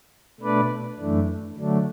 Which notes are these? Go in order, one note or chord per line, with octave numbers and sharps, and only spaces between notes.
B2 A3 D4 B4 D5
F#2 E3 A3 D4
D3 F#3 A3 D4